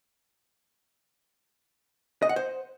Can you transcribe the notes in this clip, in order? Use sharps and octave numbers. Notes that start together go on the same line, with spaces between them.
D#5
F#5
C5